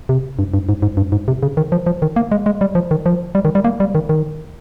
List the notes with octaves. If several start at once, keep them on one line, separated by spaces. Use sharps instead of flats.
C3
G2
G2
G#2
G#2
G2
G#2
C3
C#3
D#3
F3
F3
D#3
A#3
G#3
G#3
G3
F3
D#3
F3
G3
D#3
G3
A#3
G3
D#3
D#3